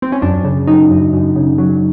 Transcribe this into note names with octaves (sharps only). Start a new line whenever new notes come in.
C4
C#4
F#2 D4
C#3
F#3 D#4
F#2
F#2
C#3
F#3